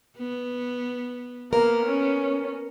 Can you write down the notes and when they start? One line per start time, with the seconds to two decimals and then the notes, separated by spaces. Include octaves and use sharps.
0.17 B3
1.53 A#3 B3 A#4
1.86 C#4